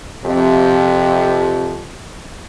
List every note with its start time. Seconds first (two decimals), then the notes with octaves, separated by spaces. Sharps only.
0.25 F2 C3